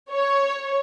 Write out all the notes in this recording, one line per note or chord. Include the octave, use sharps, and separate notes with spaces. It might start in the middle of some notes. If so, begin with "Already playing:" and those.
C#5